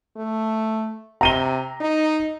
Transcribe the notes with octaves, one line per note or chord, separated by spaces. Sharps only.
A3
C3 A#5 D#7 G7
D#4